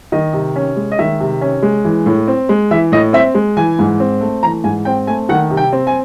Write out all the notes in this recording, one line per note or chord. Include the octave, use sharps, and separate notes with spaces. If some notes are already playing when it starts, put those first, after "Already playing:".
D#3 D#5
C3
C#4
G#3
D#5
D#3 E5
C3
C#4
G#3
E3
A2
C4
G#3
E3 E5
A2 D#5
C4 E5
G#3
E3 G#5
G#2
C4
A3
E3 A#5
G#2 G#5
C4 G5
A3 G#5
D#3 F#5
C3
G5
C4
G#5